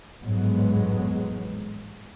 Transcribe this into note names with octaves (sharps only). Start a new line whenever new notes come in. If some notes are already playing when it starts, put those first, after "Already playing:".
A1 F2 G#2 F#3 G#3 B3